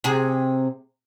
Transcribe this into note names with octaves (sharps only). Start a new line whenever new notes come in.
C3 G#4